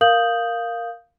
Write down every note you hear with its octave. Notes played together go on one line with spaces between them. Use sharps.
A#4 F5 D#6 G6 F#7